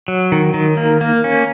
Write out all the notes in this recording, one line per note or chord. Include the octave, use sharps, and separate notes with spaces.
F#3
D#3
D#3
A#3
A#3
C#4